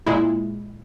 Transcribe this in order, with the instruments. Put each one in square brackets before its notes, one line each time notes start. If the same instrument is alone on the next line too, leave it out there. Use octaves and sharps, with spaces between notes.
[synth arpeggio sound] A#2 G#3 E4